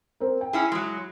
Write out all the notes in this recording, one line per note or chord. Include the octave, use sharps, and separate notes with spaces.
C4 A#4
G5
C#4 E4 G#4 B5
F#3 G#3